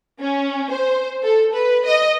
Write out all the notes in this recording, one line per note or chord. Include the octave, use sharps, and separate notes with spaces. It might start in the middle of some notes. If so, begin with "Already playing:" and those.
C#4
C5
A4
B4
D#5